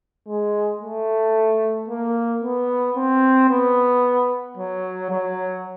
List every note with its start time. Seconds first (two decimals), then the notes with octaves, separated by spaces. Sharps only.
0.28 G#3
0.81 A3
1.88 A#3
2.42 B3
2.97 C4
3.49 B3
4.57 F#3
5.11 F#3